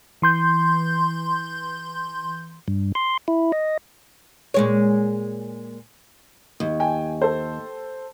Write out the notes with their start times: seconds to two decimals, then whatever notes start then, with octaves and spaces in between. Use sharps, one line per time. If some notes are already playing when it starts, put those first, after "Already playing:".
0.22 E3 C6 G6
2.68 G2
2.95 C6
3.28 E4
3.52 D#5
4.54 A#2 G#3 C#5
6.60 D#2
6.80 G5 G#5
7.22 A4 C5